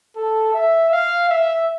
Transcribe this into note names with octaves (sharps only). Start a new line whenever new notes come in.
A4
E5
F5
E5